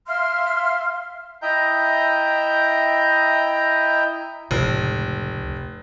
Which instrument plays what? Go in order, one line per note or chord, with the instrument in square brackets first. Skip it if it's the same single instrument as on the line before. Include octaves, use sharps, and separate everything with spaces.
[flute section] E5 F5 C6 F6
[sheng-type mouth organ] E4 D#5 E5 G5 A#5 G6
[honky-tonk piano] F1 [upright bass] C#2 A2